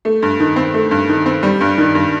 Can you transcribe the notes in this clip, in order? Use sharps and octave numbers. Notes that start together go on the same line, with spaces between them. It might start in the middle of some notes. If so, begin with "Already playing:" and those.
A3
G2
D#3
C4
A3
G2
D#3
C4
G3
G2
D#3
G2